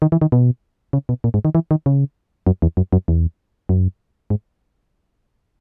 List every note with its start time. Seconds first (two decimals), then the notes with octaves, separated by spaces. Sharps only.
0.02 D#3
0.12 E3
0.21 D#3
0.32 B2
0.93 C#3
1.09 B2
1.24 A#2
1.34 G#2
1.45 D#3
1.55 E3
1.71 D#3
1.86 C#3
2.47 F#2
2.62 E2
2.77 F#2
2.93 F#2
3.08 E2
3.69 F#2
4.30 G#2